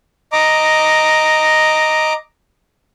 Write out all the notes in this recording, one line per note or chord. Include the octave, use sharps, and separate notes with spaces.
D#5 A#5 D6